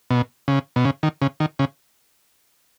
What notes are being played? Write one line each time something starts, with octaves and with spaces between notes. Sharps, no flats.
B2
C#3
B2
C#3
D#3
C#3
D#3
C#3